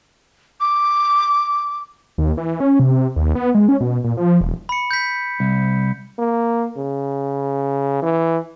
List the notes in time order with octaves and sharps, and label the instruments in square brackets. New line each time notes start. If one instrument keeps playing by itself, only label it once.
[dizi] D6
[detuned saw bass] D#2
E3
C#4
C3
D#2
B3
G#3
C#4
B2
A#2
F3
E1
[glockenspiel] B5 C#7
G6 B6
[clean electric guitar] C2
[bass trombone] A#3
C#3
E3